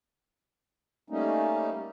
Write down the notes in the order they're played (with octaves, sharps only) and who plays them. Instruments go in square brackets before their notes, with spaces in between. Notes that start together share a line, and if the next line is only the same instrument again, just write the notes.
[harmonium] G3 A3 A#3 C#4 D#4